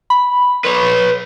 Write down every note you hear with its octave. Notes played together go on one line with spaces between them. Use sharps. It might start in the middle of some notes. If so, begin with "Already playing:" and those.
B5
B4 C#5